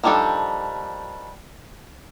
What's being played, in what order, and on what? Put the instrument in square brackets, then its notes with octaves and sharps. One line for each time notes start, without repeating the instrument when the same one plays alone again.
[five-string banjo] D#3 F3 G3 D4 A4